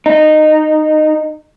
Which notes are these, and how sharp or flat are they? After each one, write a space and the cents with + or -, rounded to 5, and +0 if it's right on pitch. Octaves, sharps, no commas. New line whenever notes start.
D#4 -15